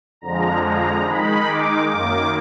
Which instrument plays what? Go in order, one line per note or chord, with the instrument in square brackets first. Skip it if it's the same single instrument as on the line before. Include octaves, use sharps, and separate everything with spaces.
[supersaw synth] F2 D3 F3 G#3 A#5
A#5
D#3 G#3 D#4 B5
D6
F#2 D#3 A#3 D6